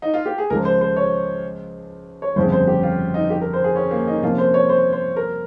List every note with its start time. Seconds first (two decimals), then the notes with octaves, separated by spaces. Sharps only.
0.02 D#4
0.14 F4
0.26 G4
0.38 G#4
0.50 C#2 C#3 F3 A#4
0.65 C5
0.81 C5
0.97 C#5
2.22 C#5
2.36 G1 F2 C#3 C5
2.52 C5
2.67 G4
2.83 F4
3.14 D#4
3.30 G4
3.41 A#4
3.53 C5
3.64 G#4
3.76 C#4
3.91 A#3
4.07 D#4
4.22 C3 F3 A#3 C#4 F4
4.38 C5
4.54 C#5
4.69 C5
4.93 C5
5.16 A#4